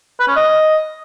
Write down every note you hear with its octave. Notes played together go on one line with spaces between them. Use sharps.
B4
C#4
D#5